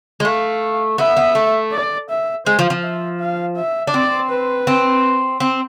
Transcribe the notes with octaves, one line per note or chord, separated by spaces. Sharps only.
G#3
A3 F5
B3 E5
B3
A3
D5
E5
G#3 C5
F3
F3
E5
F5
E5
D4
C4 D5
B4
C4
C4